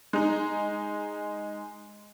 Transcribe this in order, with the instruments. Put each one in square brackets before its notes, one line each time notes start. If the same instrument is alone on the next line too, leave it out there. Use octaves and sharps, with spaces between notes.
[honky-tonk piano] G#3 D#4